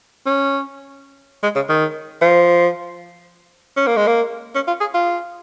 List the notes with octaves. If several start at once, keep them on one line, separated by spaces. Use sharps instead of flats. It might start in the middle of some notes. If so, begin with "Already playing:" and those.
C#4
G#3
C#3
D#3
F3
C#4
A#3
G#3
A#3
C#4
F4
G#4
F4